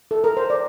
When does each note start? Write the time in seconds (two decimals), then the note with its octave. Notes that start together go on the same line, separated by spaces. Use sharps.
0.11 A4
0.24 A#4
0.37 C5
0.50 D5